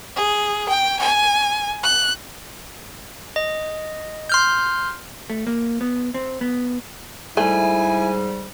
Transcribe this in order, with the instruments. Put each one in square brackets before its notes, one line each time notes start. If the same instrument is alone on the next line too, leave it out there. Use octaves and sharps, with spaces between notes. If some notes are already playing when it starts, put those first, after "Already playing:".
[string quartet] G#4
G5
G#5
F#6
[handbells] D#5
C6 F6 G6
[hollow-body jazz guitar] A3
A#3
B3
C4
B3
[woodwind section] G#2 G3 [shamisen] A3 [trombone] E4 [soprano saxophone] G#5